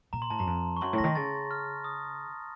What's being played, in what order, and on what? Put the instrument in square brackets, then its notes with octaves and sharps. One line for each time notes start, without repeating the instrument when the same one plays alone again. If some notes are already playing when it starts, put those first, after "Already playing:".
[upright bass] A#2 [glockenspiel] A#5
[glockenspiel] C6
[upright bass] A2 [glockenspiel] A5
[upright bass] F#2 [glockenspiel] A#5
[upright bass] F2
[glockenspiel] C#6
[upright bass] F#2 [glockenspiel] C6
[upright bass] A2
[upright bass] C#3 [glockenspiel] A#6
[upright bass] D#3
[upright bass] C#3 [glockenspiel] A6
[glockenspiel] F6
D#6